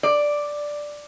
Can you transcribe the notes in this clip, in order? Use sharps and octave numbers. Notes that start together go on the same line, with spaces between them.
D5